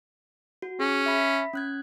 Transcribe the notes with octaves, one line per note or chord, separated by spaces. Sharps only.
F#4
C#4 G#4
E5 B5 B6
C#4 F#6 G#6